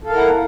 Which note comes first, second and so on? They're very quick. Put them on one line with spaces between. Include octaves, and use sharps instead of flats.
A4 F5 A#4 E4 F#5